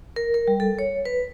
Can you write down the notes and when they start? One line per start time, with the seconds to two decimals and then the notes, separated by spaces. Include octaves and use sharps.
0.16 A#4
0.34 A#4
0.48 G3
0.60 A4
0.79 C#5
1.05 B4